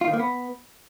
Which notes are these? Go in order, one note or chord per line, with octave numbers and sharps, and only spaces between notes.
F4
D#3
A#3
B3